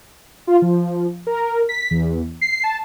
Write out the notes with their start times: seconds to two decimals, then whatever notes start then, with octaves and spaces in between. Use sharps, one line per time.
0.47 F4
0.62 F3
1.27 A#4
1.69 B6
1.91 E2
2.41 C7
2.63 A5